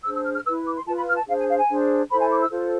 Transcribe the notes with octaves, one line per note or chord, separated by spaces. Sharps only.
D4 G#4 C5 E6
E6
F6
F6
E4 B4 E6
D6
C6
F4 B4 A5
B5
F6
A5
D4 G#4 C5 F5
G#5
F5
G#5
D4 G#4 C5
E4 A4 C5 B5
G#5
D6
E6
F4 A4 C5